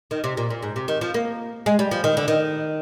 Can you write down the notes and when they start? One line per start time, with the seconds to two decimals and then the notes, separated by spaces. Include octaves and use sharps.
0.11 D#3
0.24 C3
0.37 A#2
0.50 A#2
0.62 G#2
0.76 C3
0.88 D#3
1.01 F3
1.14 A#3
1.66 G#3
1.79 G3
1.91 F3
2.04 D#3
2.17 D3
2.28 D#3